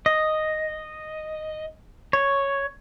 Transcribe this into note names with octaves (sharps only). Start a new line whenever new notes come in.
D#5
C#5